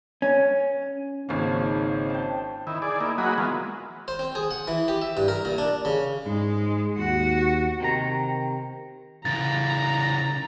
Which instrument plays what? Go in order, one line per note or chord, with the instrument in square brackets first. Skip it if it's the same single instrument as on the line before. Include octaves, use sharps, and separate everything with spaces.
[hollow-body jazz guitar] C#4
[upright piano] G#1 A#3 [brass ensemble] C#3 D#4 [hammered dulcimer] F3 C#5
[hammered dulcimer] G5 A5
[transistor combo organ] D#3 E4
G#4 D5
A#3 D#4 E4
F#3 A#3 F#4 G#4 D#5 B5
E3 G#3 B3 F4
[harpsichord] C5
C4
G#4
F#5
E3
G4
E5
G2
A#4
A#2
D4
C#3
[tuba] G#2 [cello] G#3
[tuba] D#2 [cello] F#4
[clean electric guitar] C3 D#3 A#5
[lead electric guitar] C#3 E3 [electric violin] A#5 [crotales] A6